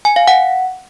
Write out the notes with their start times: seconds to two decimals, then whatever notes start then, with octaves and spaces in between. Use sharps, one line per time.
0.05 G#5
0.16 F5
0.28 F#5